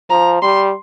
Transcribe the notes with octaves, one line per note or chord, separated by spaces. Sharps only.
F3 A#5
G3 C6